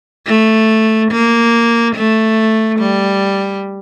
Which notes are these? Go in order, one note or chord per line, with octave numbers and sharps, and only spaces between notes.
A3
A#3
A3
G3